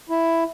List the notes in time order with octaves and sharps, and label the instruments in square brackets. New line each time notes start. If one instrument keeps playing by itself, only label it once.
[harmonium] E4